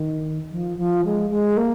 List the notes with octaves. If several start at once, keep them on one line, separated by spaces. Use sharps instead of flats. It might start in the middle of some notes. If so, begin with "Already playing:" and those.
Already playing: D#3
F3
F3
G#3
G#3
A#3